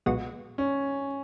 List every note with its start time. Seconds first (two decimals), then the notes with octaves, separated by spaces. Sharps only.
0.06 B1 A#2 G#3 B3 F#4
0.58 C#4